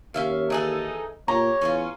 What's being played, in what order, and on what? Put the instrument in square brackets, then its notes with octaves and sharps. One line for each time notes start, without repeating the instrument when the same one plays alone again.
[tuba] D#2 [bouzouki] C#4 E5 F5
[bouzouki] E3 G#4 A4 [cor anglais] D#4
[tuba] A#2 [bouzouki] G4 [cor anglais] C#5 [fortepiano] A#5
[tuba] E2 [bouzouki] C#4 D#4 F4